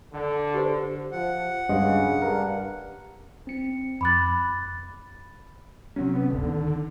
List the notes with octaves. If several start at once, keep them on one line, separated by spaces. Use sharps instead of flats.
D3
G4 C5
F3 F#5
G2 C#3 G#3 D#5
G2 A#4
C4 C#7
F2 B5 D6 F#6 A6
C3 F#3 C4 C#4
B3
D1 G1 D3
D#3